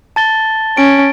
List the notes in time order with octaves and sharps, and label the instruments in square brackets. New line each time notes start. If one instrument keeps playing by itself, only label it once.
[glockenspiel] A5 A6 G7
[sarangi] C#4 [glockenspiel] D7